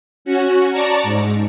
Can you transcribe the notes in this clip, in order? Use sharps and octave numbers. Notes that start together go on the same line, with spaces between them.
C#4 F#4
D5 A5 A#5 C#6
G#2